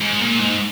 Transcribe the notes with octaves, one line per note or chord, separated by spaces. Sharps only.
G#2
A#2
G#2